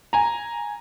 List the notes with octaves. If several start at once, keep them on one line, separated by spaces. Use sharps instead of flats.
G#5 A#5